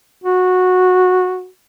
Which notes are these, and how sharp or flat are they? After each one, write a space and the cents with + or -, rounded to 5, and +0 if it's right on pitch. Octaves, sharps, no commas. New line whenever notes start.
F#4 -15